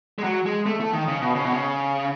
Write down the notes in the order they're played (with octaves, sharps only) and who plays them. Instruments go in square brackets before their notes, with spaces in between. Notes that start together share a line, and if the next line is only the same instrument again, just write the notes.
[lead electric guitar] G#3
F#3
G#3
A3
A3
D#3
C#3
B2
C#3
B2
C#3